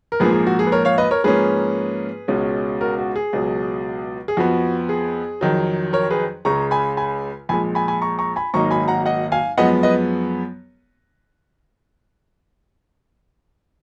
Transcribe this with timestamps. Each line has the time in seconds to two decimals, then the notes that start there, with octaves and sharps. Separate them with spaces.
0.12 A#4
0.20 A#1 G#2 F3 A#3 G#4 B4
0.33 G#4
0.47 F#4
0.59 G#4
0.67 B4
0.72 A#4 C#5
0.85 C#5 F5
0.98 B4 D#5
1.11 A#4 C#5
1.24 G#2 F3 A#3 C#4 G#4 B4
2.28 C#2 B2 G#3 C#4
2.81 F#4 A#4
2.98 F#4
3.16 G#4
3.33 C#2 B2 F#3
4.28 G#4
4.37 F2 F3 B3 F#4
4.89 G#4
5.41 F2 D#3 F#3
5.93 A#4 C#5
6.10 G#4 B4
6.45 C#2 C#3 G#3 A#5 C#6
6.71 G#5 B5
6.97 G#5 B5
7.49 A#1 A#2 G#3 G#5 B5
7.75 G#5 B5
7.88 G#5 B5
8.01 A#5 C#6
8.19 A#5 C#6
8.36 G#5 B5
8.54 G#1 G#2 F#3 A#3 D#4 A#5 C#6
8.71 G#5 B5
8.88 F#5 A#5
9.06 D#5 F#5
9.32 F5 G#5
9.58 F#2 F3 G#3 B3 D#5 F#5
9.83 B4 D#5